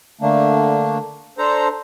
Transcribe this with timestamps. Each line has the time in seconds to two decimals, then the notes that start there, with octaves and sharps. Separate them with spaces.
0.21 D3 A3 A#3 D4
1.38 D4 A4 C5 A#5